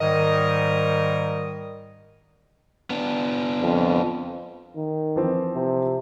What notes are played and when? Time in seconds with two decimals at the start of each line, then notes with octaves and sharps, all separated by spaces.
0.01 G#2 D#3 G3 A#4 D#5
2.90 B3 D4
3.62 F2
4.76 D#3
5.16 E3 F3 C4
5.55 C3